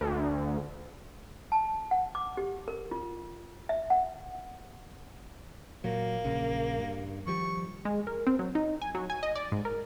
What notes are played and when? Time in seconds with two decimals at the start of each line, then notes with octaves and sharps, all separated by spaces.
0.01 D2
1.52 A5
1.91 F#5
2.15 D6
2.37 G4
2.68 A#4
2.91 F4
3.69 E5
3.90 F#5
5.84 A#2 F#3 A#3
6.25 A#1 C#3
6.79 G2
7.27 D#3 F3 G3 C#6
7.85 G#3
8.07 A#4
8.27 C4
8.39 F#3
8.55 D#4
8.82 G#5
8.95 F#3
9.10 G#5
9.23 D#5
9.35 D5
9.52 G#2
9.65 A#4